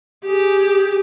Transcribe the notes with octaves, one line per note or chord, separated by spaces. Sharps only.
G4 G#4